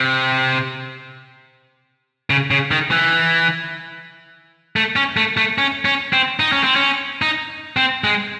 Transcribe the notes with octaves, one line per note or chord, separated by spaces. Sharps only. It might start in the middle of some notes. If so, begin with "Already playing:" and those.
Already playing: C3
C#3
C#3
D#3
E3
A3
C#4
A3
A3
C#4
C#4
C4
D#4
C#4
C4
C#4
D#4
C4
G#3